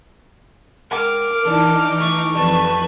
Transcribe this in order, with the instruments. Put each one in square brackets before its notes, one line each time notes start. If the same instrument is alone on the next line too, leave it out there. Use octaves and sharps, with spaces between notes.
[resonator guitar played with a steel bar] G#3 F#5 G5 [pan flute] A#4 [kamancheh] D6 F6
[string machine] E3 D#4 [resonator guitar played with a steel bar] D4 A4
[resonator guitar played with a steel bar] A3 [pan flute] C#6
[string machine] F2 B4 [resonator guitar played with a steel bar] G3 A3 C4 [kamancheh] A5